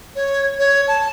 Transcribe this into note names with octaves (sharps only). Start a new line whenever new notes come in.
C#5
C#5
A5